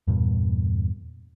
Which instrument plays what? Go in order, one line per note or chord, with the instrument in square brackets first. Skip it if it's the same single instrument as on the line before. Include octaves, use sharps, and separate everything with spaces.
[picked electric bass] E2 G2 A#2